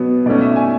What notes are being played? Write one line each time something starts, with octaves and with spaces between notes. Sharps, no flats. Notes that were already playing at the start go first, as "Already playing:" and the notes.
Already playing: B2 F#3 B3
B2 A3 C#4 D5
E5
G#5